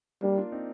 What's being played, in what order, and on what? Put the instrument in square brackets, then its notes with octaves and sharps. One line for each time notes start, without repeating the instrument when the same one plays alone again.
[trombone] G3 [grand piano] A#3 D4
[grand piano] D4 F4
C4 D#4